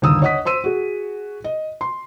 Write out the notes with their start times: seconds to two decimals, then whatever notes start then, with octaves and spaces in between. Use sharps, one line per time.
0.02 G1 D#2 D#6 E6
0.22 C#5 D#5 F#5 D#6 B6
0.45 C5 C6 E6 D#7
0.64 F#4 G#4
1.44 D#5
1.81 C6